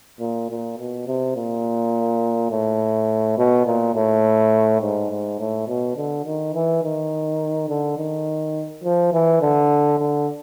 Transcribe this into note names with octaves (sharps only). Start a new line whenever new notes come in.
A#2
A#2
B2
C3
A#2
A2
B2
A#2
A2
G#2
G#2
A2
B2
D3
D#3
E3
D#3
D3
D#3
F3
E3
D3
D3